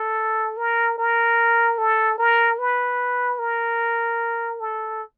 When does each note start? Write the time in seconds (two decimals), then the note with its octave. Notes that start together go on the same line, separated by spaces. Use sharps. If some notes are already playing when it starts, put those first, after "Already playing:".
Already playing: A4
0.57 A#4
0.98 A#4
1.78 A4
2.18 A#4
2.59 B4
3.39 A#4
4.60 A4